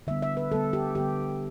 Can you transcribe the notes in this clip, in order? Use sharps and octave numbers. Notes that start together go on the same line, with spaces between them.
D3 G3 B3 E5
E5
B4
D3 G3 B3 A4
G4
D3 G3 B3 G4